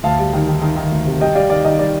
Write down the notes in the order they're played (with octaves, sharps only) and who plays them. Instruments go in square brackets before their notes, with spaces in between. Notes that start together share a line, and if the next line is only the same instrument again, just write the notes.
[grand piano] D2 F5 A5
G3
D#3
D#3
D#3
D#3
D2
C3
G3 D#5 G5
G3 D5 F5
D#3 D5 F5
D#3 D#5
G3 D5